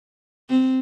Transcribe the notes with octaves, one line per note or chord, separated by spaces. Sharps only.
C4